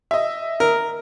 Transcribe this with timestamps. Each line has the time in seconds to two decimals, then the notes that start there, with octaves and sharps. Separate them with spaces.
0.11 D#5 E5
0.60 A#4